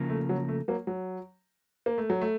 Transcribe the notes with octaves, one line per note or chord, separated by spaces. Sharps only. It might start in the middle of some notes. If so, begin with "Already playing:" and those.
Already playing: C#3 F3 A#3
A3
F#3
A3
F#3 A#3
F#3
A#3
A3
F#3
A3